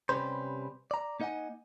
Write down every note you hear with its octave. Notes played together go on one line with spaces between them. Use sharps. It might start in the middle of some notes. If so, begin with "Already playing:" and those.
C3 G3 C#4 B4 C5
D5 A#5
A#3 D#4 D#5 F5 F#5 G#5